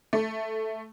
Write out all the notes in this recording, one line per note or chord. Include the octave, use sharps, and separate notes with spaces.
A3